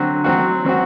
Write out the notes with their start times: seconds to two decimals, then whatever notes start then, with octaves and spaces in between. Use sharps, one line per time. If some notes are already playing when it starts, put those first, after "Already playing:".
Already playing: D3 F#3 C4 F#4
0.24 F#3 C4 F#4
0.65 F#3 C4 F#4